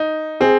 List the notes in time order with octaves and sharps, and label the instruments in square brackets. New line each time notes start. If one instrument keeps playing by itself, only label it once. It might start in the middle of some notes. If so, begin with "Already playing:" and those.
Already playing: [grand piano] D#4
[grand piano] C4 [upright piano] G#4